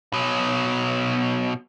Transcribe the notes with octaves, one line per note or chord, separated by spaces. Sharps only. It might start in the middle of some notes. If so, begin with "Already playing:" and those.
B2 F#3